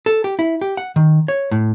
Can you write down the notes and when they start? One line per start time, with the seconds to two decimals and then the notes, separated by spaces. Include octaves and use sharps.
0.06 A4
0.24 G4
0.39 E4
0.61 G4
0.77 F#5
0.96 D#3
1.28 C#5
1.51 A2